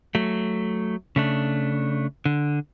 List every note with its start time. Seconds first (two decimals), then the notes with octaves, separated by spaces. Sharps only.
0.15 F#3 A3
1.16 C#3 A3 D4
2.25 D3